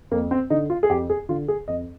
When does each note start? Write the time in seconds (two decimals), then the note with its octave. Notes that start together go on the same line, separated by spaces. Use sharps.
0.11 F2 A#3
0.31 C4
0.50 D3 D#4
0.70 F4
0.83 G#4
0.90 F2 G4
1.10 G#4
1.29 D3 F4
1.48 G#4
1.68 F2 D#5